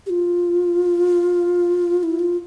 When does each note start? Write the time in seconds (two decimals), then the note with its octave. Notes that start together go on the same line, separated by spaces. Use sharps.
0.06 G4
0.10 F4
2.03 E4
2.19 F4